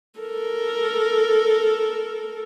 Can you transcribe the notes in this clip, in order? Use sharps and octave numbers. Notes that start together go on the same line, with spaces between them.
A4 A#4